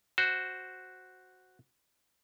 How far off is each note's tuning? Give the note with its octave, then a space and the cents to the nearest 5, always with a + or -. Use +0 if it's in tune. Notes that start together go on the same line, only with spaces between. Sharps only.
F#4 +0 C5 +0